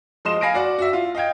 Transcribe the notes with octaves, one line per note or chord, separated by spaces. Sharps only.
F3 G#3 D#5 C6 D#6 E7
F5 G#5 B5 A#6 C7 D7
F#4 D5 F#5
F#4 E5
F4
D#5 F5 G5 G#6